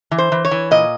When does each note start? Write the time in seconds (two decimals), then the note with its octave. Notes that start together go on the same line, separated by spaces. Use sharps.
0.11 E3
0.18 C5
0.32 E3
0.45 C#5
0.51 E3
0.71 A#2 D#5